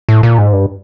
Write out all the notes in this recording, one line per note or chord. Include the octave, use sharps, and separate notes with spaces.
A2
A#2
G#2
G2